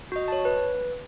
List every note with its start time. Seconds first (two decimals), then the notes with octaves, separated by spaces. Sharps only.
0.12 F#4 D#5
0.28 C#5 A5
0.45 B4